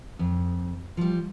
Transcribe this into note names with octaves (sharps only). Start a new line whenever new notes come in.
F2
F3 G3